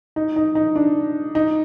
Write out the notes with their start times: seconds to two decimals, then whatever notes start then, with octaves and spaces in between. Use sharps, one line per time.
0.16 D#4
0.36 D#4
0.55 D#4
0.76 D4
1.35 D#4